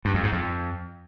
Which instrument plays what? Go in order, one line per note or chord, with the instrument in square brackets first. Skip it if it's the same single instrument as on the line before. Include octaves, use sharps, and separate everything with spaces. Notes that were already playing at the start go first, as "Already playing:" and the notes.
[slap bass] G2
F2
G#2
F2